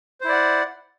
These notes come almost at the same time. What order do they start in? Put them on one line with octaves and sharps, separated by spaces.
C5 E4 D5 F#5